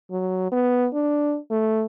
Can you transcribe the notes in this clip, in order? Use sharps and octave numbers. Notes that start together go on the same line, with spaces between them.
F#3
B3
D4
A3